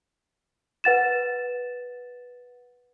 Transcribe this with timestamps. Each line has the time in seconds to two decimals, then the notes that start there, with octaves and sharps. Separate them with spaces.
0.84 B4 F#5 A6 E7